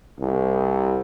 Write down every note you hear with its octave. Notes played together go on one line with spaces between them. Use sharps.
C2